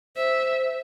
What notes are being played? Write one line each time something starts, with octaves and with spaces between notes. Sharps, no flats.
C5 E5